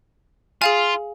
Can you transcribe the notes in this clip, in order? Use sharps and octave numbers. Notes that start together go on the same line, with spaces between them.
F4 G#4 F5 G#5